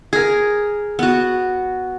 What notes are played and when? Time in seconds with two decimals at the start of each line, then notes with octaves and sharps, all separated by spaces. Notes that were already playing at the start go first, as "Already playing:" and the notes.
0.13 G#4 A#4
0.99 B3 F#4